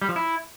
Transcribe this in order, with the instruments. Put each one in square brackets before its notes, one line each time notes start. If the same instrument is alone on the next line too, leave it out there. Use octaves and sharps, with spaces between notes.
[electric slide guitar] G3
F3
E4